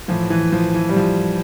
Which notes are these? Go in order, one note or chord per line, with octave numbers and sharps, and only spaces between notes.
A2 E3 F3
E3
F3
E3
G3
F3